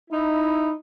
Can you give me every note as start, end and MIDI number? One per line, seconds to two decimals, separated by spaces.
0.10 0.71 63
0.10 0.71 64